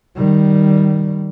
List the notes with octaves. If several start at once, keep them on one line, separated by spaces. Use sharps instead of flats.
D#3 G3